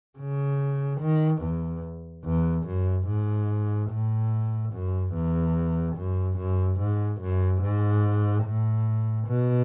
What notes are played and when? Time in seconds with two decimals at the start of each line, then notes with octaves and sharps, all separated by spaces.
0.19 C#3
1.00 D#3
1.42 E2
2.24 E2
2.66 F#2
3.08 G#2
3.90 A2
4.73 F#2
5.14 E2
5.96 F#2
6.37 F#2
6.80 G#2
7.21 F#2
7.62 G#2
8.44 A2
9.27 B2